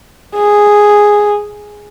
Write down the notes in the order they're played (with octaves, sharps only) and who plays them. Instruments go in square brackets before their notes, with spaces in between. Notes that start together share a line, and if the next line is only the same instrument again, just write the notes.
[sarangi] G#4